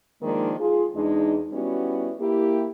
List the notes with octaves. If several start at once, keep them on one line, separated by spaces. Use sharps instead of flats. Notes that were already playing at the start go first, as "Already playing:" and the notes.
D#3 F3 G#3 A#3 D4 D#4
F4 G#4
E2 G#3 D4 D#4
G3 B3 C#4 E4 F#4
A#3 E4 G4